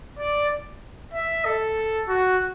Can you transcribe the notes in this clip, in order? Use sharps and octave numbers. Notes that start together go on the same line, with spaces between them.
D5
E5
A4
F#4